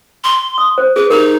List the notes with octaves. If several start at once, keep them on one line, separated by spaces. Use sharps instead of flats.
C6
D#6
C5
G#4 B4
D#4 G4 A#4